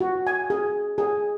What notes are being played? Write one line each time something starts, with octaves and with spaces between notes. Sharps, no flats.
F#4
G#5
G#4
G#4